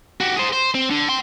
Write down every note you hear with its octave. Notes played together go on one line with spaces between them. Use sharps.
F#4 G4
G#4 C5
C5
C4
D3
G5 C6